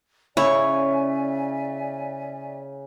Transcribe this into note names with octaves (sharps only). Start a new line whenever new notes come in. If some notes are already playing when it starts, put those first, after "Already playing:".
C#3 E4 C#5 D5 E5 G#5